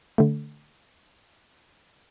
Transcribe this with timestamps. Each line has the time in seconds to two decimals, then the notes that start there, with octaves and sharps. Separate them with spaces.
0.18 D3 A3